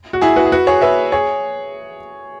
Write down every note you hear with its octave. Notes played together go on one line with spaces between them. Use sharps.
F#4
E4 G#4
F#4 B4
G#4
F#4 B4
G#4 C#5
B4 E5
G#4 C#5